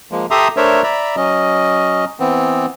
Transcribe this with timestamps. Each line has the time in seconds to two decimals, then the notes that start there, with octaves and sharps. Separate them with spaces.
0.12 F3 G#3 A#3
0.31 G4 A4 E5 A#5 C6 D#6
0.57 A3 D4 A#4 C5 C#5 E5
0.83 D5 E5 A#5 B5
1.17 F#3 C#4 D#5
2.20 E3 B3 C4